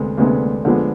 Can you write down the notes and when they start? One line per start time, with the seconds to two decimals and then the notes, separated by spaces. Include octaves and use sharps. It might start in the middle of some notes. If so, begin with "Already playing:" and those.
Already playing: D2 C3 G#3 B3
0.18 D2 C3 G#3 B3 D4
0.65 D3 F3 G#3 B3